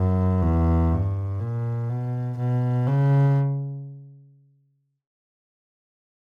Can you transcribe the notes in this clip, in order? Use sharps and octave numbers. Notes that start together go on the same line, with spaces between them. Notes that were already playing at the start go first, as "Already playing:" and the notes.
Already playing: F#2
E2
G2
A#2
B2
B2
C#3